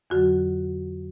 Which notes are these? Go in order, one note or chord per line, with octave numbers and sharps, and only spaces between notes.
F2 D3 F#3 F#4